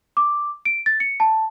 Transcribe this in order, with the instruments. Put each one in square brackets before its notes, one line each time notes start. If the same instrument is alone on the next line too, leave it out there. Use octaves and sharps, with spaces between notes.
[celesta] D6
D7
A6
C#7
A5